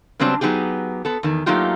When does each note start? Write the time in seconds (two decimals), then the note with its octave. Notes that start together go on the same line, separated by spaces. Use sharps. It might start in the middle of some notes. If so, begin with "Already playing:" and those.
0.19 C#3 F#3 G3 B3 C4 D4
0.41 F#3 B3 D#4 G4 G#4
1.05 B3 A4
1.23 E2 D#3
1.46 F#3 A3 A#3 D#4 F4 G4